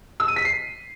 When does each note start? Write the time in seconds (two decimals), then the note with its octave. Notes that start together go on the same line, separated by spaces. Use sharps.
0.20 E6
0.28 D#7
0.36 B6
0.45 C7